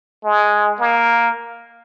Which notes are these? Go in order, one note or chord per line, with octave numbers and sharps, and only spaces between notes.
G#3
A#3